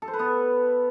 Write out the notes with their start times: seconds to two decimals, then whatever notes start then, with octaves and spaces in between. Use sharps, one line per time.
0.02 A4
0.08 C5
0.13 B4
0.19 B3